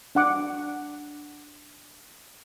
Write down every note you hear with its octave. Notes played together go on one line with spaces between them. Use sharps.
D4 F#5 D6